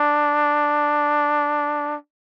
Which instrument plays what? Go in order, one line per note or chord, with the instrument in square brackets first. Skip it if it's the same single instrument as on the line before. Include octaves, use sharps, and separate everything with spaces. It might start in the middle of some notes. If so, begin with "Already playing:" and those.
Already playing: [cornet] D4